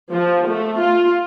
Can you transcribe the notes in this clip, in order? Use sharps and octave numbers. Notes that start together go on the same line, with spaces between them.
F3
A3
F4